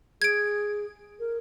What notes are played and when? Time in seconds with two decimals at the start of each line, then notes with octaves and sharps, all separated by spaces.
0.22 G#4 G#6 D7
1.19 A#4